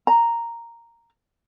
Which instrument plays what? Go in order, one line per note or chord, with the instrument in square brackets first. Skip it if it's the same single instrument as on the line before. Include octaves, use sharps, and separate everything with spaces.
[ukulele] A#5